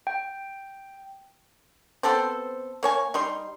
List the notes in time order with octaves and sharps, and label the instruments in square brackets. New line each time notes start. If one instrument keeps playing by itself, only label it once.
[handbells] G5
[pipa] B3 C4 A4 C5
A#3 C#5 G#5
G3 D#4 C6